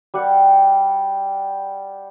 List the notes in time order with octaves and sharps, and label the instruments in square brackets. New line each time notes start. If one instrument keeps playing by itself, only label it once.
[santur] G3 F#5